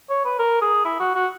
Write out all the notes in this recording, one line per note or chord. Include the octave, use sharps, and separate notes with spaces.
C#5
B4
A#4
G#4
E4
F#4
F#4